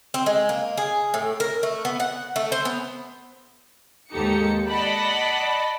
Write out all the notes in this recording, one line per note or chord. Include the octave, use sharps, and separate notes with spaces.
C4
G#3
A#3
G#4
A2
A#4
A3
B3
F#5
A3
C5
B3
D#2 G#2 D#4 G4 A4 C#7
D5 D#5 F#5 A5 B5 B6